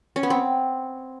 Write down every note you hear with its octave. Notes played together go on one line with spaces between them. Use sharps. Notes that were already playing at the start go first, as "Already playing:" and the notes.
C#4
B3
C4